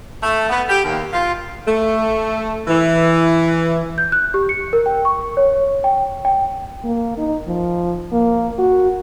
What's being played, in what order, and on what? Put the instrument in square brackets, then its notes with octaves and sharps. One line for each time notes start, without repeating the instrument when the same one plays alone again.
[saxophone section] A3
B3
G4
D#2
F4
A3
E3
[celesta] G6
F#6
G4
C#7
A#4
G5
C#6
[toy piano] C#5
G5
G5
[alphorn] A#3
D#4
F3
A#3
F#4